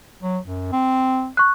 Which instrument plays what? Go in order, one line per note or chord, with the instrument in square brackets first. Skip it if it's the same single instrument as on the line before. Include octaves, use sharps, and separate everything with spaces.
[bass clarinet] F#3
F#2
C4
[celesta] C#6 F#6